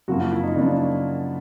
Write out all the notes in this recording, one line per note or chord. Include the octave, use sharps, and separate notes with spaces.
F#2 C#3 F3 A#3 F#4
F4
E4
D#4
F#2 C#3 F3 A#3 D4
D4